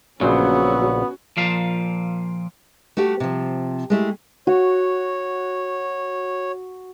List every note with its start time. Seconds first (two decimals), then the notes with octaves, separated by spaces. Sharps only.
0.21 A#1 C#3 F#3 B3 C#4 F#4 C5
1.37 A#2 F3 F5
2.97 A3 F#4 G4
3.20 C3 F3
3.90 G#3 A3 E4 G4
4.47 F#4 C#5